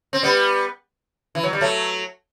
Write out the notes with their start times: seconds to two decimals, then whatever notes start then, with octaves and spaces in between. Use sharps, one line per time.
0.13 C4
0.23 G3 B3
1.35 E3
1.43 F#3
1.53 G3
1.61 F#3 A3